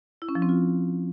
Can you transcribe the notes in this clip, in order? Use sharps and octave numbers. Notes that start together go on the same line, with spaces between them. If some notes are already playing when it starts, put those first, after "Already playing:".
E4
C#4
F3
C4
F4